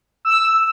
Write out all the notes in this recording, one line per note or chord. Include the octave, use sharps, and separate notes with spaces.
E6